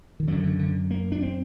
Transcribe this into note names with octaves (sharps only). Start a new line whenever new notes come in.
D#3
F#2 D3 F#3
D3
D3
A#3
D4
C4